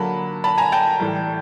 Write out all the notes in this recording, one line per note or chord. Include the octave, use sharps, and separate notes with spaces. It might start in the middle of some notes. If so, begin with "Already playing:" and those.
Already playing: D3 F#3 A#3 A5 B5
A5 B5
G#5 A#5
G5 A5
A2 E3 G3